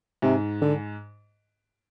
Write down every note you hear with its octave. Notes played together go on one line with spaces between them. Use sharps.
G#2 C3
D3